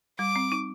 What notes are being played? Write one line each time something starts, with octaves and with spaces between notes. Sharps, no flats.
G3 D6
C4
D#4